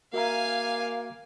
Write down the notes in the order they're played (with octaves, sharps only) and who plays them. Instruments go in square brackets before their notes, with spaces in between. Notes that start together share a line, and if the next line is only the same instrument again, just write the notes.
[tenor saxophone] A#3 [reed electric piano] F#4 E5 A#5 [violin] F5 G#5